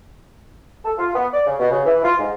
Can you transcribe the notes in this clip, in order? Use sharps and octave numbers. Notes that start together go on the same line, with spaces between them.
A4
F4
B3
D5
C#3
B2
C#3
E3
F4
G#2